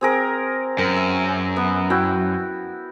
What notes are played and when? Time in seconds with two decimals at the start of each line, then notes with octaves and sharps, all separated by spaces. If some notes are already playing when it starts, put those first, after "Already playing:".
0.01 C4 G#4 A#4
0.78 F#2 A#4
0.96 E5
1.56 B3
1.90 E4 F#4 G5